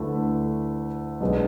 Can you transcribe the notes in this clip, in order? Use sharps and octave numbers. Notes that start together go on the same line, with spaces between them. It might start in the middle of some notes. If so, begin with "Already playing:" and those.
Already playing: D2 D3 A3 E4 B4
B1 B2 G#3 B3 D4